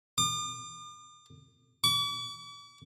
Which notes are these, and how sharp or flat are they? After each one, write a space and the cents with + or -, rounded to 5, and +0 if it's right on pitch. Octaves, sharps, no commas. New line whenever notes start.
D6 +45
D6 -45